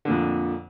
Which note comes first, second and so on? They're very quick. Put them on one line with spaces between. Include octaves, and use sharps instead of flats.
D3 A#2 F2